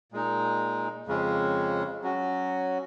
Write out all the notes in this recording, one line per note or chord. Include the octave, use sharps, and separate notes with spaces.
A#2 G#3 D#4
F2 C#3 G#3 C#4
F#3 C#4 F#4